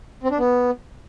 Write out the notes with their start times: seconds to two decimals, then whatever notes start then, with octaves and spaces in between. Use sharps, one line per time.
0.23 C4
0.31 D4
0.38 B3